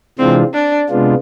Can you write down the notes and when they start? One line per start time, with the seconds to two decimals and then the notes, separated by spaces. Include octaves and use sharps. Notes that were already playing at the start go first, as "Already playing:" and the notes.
0.19 C3 E3 G#3 C4 D4 F4
0.54 D4
0.89 C3 G#3 B3 D4 F4